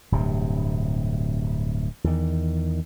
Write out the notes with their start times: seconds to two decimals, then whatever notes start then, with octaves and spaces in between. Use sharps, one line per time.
0.12 D1 G2 C3
2.04 E2 D#3